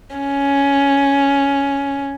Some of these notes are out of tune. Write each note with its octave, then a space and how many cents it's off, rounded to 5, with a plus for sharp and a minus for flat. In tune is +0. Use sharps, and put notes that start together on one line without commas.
C#4 +10